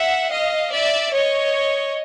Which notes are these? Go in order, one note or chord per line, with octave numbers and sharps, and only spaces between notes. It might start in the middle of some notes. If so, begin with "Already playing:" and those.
Already playing: E5 F#5
D#5 F5
D5 E5
C#5 D#5